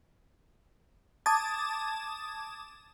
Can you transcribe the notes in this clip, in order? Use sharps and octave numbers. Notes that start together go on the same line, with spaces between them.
A5 D6 D#6 G#6 A6